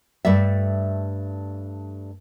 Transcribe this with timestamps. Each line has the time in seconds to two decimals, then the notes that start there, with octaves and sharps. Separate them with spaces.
0.25 G2 A3 A4 D5 E5